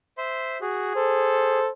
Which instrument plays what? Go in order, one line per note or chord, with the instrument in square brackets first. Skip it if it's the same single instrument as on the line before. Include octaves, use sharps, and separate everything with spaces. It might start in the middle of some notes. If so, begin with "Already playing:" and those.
[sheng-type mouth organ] C5 E5 C6
[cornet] F#4 [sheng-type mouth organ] G#4
[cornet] A4 [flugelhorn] C5